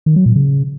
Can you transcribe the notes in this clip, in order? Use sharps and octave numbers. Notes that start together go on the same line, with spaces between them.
D#3
F#3
A#2
C#3